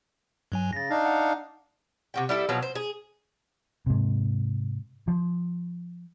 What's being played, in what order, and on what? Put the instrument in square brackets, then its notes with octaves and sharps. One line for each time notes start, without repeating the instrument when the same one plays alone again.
[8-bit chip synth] G2 F#3 G#5
[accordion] C#3 [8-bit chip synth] A6 A#6
[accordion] D4 D#4 F5
[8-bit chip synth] F#5
[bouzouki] C3 F#4 G5
G3 E4 A4
B2 F3 F#3
C5
G#4
[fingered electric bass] G#2 C3
F3